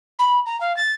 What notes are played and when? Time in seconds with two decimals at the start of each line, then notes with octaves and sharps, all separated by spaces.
0.19 B5
0.46 A#5
0.61 F5
0.76 A6